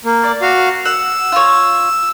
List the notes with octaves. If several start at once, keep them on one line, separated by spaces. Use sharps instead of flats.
A#3
D5
F#4 F5
F#5 E6
F4 C#5